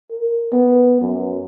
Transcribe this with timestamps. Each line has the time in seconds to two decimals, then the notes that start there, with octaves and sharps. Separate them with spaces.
0.11 A#4
0.53 B3
1.01 F#2